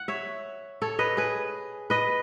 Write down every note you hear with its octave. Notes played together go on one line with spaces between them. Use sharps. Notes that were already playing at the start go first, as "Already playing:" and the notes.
Already playing: F#5
C#5 E5
A4 C#5
B4 D#5
G#4 B4
B4 D#5